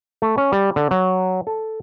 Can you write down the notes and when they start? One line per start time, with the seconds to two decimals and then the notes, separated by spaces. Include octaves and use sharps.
0.22 A3
0.37 C#4
0.52 G3
0.76 D3
0.91 F#3
1.47 A4